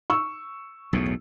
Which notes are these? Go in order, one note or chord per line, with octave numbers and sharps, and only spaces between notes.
C#6 E6
B1 E2 A2